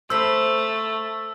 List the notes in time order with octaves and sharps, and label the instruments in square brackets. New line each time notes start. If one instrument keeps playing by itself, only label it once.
[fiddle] A3 [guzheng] C5 B5 [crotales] E6